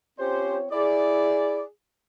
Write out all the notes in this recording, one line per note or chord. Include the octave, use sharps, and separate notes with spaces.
C4 C#4 F4 G4 C5 C#5
E4 G#4 D5